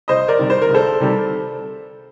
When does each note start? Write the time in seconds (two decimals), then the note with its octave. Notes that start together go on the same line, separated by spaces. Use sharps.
0.08 C2 C5 D#5
0.28 A#4 D5
0.39 C3 D#3 G3
0.50 C5
0.62 A#4
0.69 C2
0.74 A4 C5
1.00 C3 D#3 G3